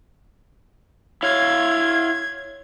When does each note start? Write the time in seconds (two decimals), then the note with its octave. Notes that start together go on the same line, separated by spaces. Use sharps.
1.23 E4 C#5 F5 G#6